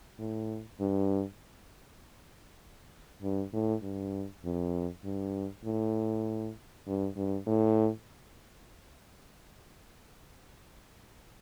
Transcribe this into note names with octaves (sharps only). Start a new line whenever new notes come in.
A2
G2
G2
A2
G2
F2
G2
A2
G2
G2
A2